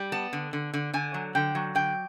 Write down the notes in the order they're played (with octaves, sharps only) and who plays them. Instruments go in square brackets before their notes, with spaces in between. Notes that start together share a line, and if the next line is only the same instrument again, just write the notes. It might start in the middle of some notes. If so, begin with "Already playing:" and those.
Already playing: [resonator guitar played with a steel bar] G3
B3 A5
D3
D3
D3
D3 G#5
F#3
D3 G5
F#3
D3 G5